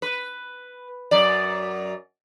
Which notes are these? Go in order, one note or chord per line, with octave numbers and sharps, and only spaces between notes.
B4
F#2 D5